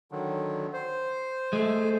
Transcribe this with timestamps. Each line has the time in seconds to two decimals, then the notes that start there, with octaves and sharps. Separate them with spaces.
0.12 D3 D#3 F#3
0.73 C5
1.53 G#3 A3